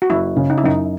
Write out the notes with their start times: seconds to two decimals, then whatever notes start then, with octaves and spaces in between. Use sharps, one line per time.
0.02 F#4
0.10 F#1 E4
0.36 C#3
0.50 D#4
0.58 E4
0.64 F#2 D#4